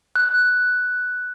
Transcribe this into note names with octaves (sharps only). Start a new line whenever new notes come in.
F#6